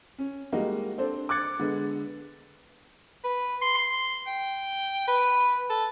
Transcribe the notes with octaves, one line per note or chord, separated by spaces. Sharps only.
C#4
G3 G#3 A#3 D#4 F#4
C4 D4 A4 C5
D6 F#6 G#6 A6 C#7
D3 G#3 B3
B4
C6
C6
G5
B4
A4